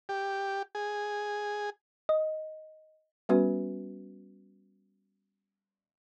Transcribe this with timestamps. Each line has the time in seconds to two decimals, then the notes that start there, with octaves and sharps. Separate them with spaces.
0.09 G4
0.75 G#4
2.09 D#5
3.29 G3 B3 C#4 F#4 B4